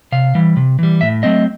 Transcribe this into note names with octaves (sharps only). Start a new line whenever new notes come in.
C3 F5
E3 G3
C3
E3 G3
A2 E5
F#3 A3 C4 D#5